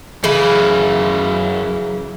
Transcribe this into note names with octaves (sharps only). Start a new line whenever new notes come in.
F#2 C#3 E3 B5